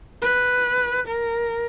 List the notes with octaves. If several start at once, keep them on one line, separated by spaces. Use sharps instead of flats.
B4
A#4